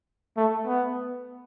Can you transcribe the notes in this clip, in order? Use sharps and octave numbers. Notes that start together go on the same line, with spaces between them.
A3
B3